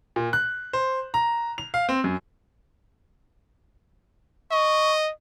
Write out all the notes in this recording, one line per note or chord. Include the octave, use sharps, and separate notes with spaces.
A#2
F#6
C5
A#5
F7
F5
C4
F#2
D#5 C#6